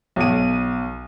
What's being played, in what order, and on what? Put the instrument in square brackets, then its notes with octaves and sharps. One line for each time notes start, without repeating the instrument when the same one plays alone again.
[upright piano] B1 D#7